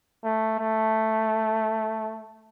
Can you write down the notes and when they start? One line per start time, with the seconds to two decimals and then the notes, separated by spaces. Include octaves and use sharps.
0.24 A3
0.59 A3